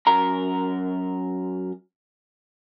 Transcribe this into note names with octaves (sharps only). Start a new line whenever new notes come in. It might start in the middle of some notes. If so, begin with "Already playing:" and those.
F#2 A#4 A#5